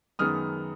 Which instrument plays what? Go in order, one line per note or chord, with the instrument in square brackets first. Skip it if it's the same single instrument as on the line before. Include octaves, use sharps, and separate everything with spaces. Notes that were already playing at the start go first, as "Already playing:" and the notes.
[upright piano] F#2 D#3 G#3 B3 D#6 F6